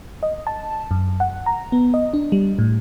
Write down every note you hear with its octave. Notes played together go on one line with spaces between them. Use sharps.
D#5
A5
F#2
F#5
A#5
B3
D#5
D4
G3
A2